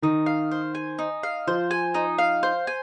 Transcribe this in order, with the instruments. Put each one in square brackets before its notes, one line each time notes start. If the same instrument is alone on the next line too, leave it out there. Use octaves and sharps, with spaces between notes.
[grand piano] D#3 [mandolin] D#4
[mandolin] F5
C5
G#5
D#4
F5
[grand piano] F3 [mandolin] C5
[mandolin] G#5
D#4
F5
C5
G#5